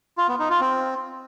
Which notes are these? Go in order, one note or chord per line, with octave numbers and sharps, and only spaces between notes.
F4
B3
D#4
F4
C4